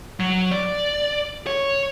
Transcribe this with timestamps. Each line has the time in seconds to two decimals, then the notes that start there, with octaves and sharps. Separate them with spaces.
0.20 F#3
0.51 D5
1.47 C#5